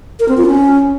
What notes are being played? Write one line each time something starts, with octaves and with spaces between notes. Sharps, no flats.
A#4
C4
F4
C#4